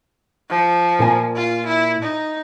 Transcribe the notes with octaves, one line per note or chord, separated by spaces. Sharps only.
F3
A#2 A#4 G#5
F4
E4
D#4